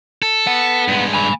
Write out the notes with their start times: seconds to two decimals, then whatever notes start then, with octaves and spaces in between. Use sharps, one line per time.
0.22 A4
0.47 B3 F#5
0.88 G2 G#3
1.13 G#5 B5